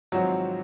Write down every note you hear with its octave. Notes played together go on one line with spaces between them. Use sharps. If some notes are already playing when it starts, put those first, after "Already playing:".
G#1 G#2 F3 F#3 C4 F#4